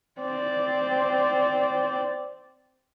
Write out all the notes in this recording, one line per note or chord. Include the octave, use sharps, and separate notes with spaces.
C4 D5